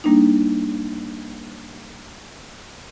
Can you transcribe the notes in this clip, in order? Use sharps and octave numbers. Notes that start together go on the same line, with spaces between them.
G3 A#3 D4 D#4